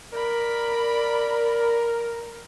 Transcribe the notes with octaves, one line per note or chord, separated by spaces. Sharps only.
A#4 D5 B5